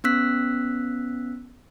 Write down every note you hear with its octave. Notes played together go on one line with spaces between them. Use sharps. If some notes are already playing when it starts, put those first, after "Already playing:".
B3 C#4 E6 F#6 B6